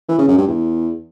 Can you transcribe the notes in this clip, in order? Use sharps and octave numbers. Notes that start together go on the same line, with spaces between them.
E3
C#3
F#2
G2
E2